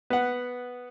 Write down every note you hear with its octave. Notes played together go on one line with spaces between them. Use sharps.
B3 F#5